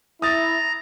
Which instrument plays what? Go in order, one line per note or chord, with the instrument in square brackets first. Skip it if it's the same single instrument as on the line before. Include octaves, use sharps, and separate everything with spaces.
[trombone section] E4 [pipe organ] A#5 A#6 [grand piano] D#6 A6